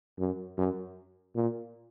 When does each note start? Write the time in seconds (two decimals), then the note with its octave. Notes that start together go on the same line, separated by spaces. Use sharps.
0.19 F#2
0.58 F#2
1.36 A#2